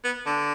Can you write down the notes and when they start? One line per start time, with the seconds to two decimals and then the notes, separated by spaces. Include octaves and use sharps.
0.04 B3
0.26 D3